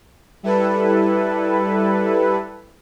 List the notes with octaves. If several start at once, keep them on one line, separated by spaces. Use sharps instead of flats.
G3 E4 A4 B4